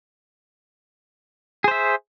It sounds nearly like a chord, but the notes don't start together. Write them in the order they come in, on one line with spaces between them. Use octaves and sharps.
G#4 C5 E5